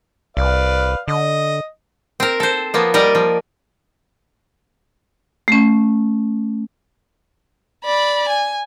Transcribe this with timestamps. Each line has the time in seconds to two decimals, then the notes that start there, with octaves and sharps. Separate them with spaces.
0.37 C2 B4 D5 F5
1.08 D3 D#5
2.20 C4 A#4
2.40 A4 C5
2.74 F3 A#3 B3
2.94 G3 A#4 D5 D#5
3.15 F3
5.48 A3 C#4
7.85 D5 B5
8.29 G#5